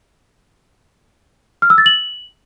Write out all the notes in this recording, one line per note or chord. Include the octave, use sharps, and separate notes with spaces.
F6
E6
A6
F#7